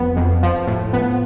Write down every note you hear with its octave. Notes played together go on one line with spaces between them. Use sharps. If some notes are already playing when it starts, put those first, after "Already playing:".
Already playing: F2 B3
F2
F3
A2
B3